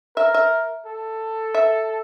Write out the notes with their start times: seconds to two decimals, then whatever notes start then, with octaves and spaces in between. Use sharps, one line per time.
0.16 A#4 E5
0.34 E5
0.86 A4
1.55 E5